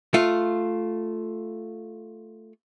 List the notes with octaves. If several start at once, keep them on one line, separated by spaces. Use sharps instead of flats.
A3 F4